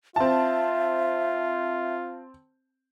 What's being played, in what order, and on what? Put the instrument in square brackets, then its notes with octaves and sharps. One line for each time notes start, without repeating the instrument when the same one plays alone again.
[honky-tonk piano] C4 A5 [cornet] F4 [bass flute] E5